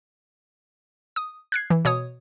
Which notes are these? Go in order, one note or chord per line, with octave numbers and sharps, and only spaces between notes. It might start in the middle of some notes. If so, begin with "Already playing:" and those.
D#6
F#6 G#6 C7
E3
B2 C#5 D#6